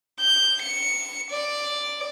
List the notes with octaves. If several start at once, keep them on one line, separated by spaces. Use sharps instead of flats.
G6
C#7
D5